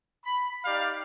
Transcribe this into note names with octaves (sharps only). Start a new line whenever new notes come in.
B5
D#4 G4 D5 F5